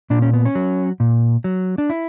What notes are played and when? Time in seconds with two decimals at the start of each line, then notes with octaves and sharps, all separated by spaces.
0.10 A#2 D4
0.22 C#4
0.33 B3
0.45 C#4
0.55 F#3
1.00 A#2
1.44 F#3
1.78 D4
1.90 E4